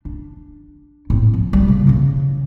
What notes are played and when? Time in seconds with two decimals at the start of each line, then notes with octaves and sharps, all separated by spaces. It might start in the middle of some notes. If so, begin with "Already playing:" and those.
0.05 D4
1.10 A2 C4
1.34 F3
1.53 G3 G#3
1.68 C#3
1.87 C#3 E3